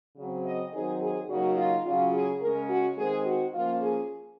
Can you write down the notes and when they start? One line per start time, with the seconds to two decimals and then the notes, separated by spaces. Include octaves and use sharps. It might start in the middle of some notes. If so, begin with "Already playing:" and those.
0.17 C#3 F#3 C4
0.45 D#5
0.73 D#3 F#3 C4 D#4 G#4
1.02 G#4
1.29 C#3 F#3 A#3 D#4 F#4
1.57 F4
1.85 C#3 F#3 C#4 F4
2.13 G#4
2.41 C#3 G#3 C#4 A#4
2.69 F#4
2.98 D#3 G#3 C4 G#4
3.26 F#4
3.54 F3 A#3 C#4 F4
3.82 G#4